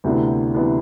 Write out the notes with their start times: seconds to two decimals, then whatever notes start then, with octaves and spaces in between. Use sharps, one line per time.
0.04 D2 C3 E3 B3 D4
0.55 C3 E3 B3 D4